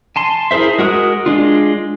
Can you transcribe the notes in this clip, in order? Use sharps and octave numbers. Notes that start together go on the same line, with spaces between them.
G#5 A5 C6
E4 G#4 A#4 C5 E5
G#3 F#4 A#4 D#6 F#6
G#3 D4 F4